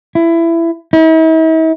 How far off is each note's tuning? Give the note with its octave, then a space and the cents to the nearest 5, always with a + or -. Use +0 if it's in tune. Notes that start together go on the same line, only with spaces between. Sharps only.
E4 +20
E4 -45